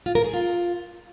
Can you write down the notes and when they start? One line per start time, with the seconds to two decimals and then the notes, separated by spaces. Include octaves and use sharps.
0.06 F4
0.15 A#4
0.24 G#4
0.34 F4